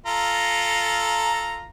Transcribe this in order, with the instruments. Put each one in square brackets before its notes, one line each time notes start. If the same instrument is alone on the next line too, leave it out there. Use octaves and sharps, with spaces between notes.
[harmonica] F4 A4 A#5